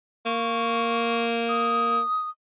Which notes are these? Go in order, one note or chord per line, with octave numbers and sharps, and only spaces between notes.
A#3 C#6
D#6